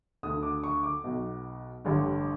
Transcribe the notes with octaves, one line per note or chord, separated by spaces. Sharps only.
D2 D3 D#6
D6
C#6
D6
B1 B2
A1 G2 D3